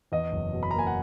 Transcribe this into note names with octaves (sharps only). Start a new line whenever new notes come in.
E2 D#5
F#1
B2
B5
A#5
A#3
G#5
F#5